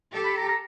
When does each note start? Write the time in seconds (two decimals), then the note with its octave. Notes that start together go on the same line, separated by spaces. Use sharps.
0.12 G4 A4
0.24 B5
0.37 A#5
0.48 A#5